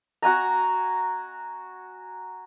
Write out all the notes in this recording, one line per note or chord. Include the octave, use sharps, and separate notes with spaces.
F#4 F#5 G#5 A#5